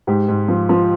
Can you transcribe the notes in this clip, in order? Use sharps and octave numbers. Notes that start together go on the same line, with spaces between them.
G#2 G4
G#2
F3
F3